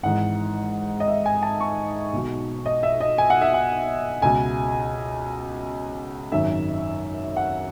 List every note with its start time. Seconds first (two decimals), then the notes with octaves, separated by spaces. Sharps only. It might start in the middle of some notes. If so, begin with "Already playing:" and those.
0.03 G#1 G#2 E3 F#5
1.00 D#5
1.08 E5
1.26 G#5
1.43 A5
1.61 C#6
2.13 B1 B2
2.66 D#5
2.83 E5
3.00 D#5
3.18 G#5
3.30 F#5
3.42 E5
3.54 F#5
4.22 C#2 B2 G#5
6.32 G#1 F#2 D#3 E5
7.36 F#5